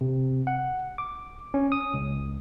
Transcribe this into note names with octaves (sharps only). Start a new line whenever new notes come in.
C3
F#5
D6
C#4
D#6
C#2